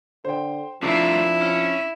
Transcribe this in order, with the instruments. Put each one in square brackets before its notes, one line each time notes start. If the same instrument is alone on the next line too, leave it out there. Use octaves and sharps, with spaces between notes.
[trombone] D3 [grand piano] C5 G5
[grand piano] C3 D4 [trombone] F3 [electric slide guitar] A3 F4 A#4 [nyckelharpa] E4
[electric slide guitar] C#4